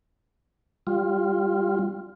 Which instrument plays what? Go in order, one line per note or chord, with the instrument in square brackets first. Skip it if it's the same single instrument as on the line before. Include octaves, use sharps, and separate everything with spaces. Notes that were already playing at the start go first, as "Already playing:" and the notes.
[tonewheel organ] G3 F4